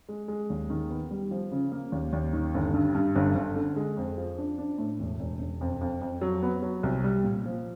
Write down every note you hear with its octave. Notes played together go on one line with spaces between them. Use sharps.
G#3
G#3
D#2
D#3
B3
G3
F3
C#3
A#3
D#2
D#2
D#3
G1
G2
G2
G1
G1
D3
G#3
F2
F3
D4
D4
A2
E1
E1
E1
F2
F2
F2
F#3
B3
F#3
C2
G3
A#2
F3